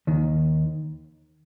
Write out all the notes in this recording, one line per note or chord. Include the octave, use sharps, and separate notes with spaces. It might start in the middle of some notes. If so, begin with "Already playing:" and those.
D#2 D#3